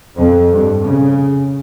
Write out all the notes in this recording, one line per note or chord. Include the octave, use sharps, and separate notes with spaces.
F2
G2
C#3